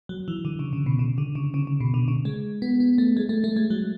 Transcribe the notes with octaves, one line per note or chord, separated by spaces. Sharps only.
F#3
E3
D3
C#3
C#3
B2
C#3
D3
C#3
C#3
C#3
B2
D3
C#3
G#3
B3
B3
A3
G#3
A3
A3
G#3
F#3